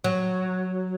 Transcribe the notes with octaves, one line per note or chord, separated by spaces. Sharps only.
F#3